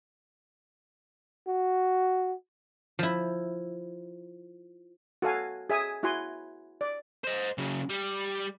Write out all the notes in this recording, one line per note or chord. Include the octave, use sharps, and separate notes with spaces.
F#4
F3 E4
F#4 A4 F5 G#5
G#4 E5 G#5 D#6
E4 F#4 F#5 G#5 C6
D5
C5 D#5
C#3 F#3
G3